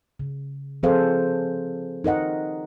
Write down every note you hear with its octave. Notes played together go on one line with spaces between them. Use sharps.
C#3
F3 C4 G#4 A4 C5 F5
D#4 A#4 D#5 F#5